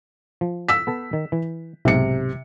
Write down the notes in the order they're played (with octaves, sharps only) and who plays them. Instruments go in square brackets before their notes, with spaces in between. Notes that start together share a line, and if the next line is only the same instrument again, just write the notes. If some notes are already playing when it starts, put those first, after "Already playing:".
[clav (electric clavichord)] F3
[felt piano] E6 B6
[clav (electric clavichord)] B3 A4 A5
D#3
E3
[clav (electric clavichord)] B1 G#2 [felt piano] C3 C#7